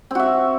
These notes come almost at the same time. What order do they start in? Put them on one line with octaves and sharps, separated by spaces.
C4 F#4 E5